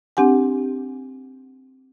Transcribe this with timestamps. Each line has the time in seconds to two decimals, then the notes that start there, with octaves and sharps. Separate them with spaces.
0.17 C4 D4 G4 F#5 G#5